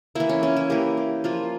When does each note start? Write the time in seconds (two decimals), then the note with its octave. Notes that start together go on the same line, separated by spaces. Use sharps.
0.15 E3 A#3 E4
0.29 C#4
0.43 C#4
0.57 E4
0.70 E3 A#3 G4
0.97 G4
1.24 F3 A#3 F4